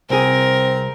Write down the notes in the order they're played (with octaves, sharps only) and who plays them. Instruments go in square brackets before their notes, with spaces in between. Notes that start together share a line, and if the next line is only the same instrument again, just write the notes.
[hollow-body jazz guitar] C2 G#4 [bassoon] C4 [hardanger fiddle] A#4